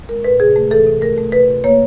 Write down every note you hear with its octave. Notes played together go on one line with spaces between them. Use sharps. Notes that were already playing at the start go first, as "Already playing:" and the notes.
G#3 A#4
A2 B4
C3 G#4
A3
E3 A4
C3
A3 A#4
A3
C3 B4
F2
A#3 C#5